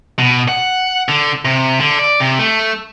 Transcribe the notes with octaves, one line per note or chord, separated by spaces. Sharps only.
B2
F#5
D3
C3
D3
D5
C3
A3